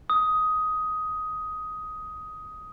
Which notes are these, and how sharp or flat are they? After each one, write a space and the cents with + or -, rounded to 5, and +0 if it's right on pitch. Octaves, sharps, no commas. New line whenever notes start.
D#6 +10